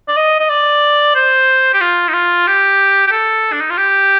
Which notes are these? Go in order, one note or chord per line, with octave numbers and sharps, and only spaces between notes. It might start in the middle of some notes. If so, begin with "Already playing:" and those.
D5
D#5
D#5
D5
C5
G4
F4
D#4
F4
G4
G4
A4
D4
D#4
F4
G4